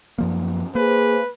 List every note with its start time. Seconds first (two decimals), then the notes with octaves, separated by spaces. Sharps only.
0.18 F#2 F3 A#3
0.75 A#3 G#4 B4 C5